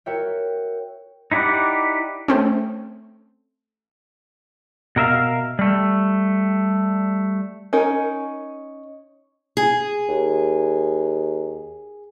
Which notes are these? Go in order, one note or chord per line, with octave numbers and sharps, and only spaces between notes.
F#4 A#4 C#5 E5 G5
D#4 E4 G4 D5 F#5
A3 C4 C#4
B2 A#4 E5 F5
G3 A3
C#4 D#4 A#4
G#4
D#2